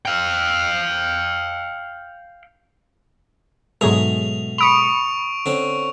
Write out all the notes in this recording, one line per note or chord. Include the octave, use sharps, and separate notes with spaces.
F5 G5
G#2 B2 F#3 G#3 A3 G#4 F7
B5 C#6 D#6 C#7 D7 F7
D3 C4 C#4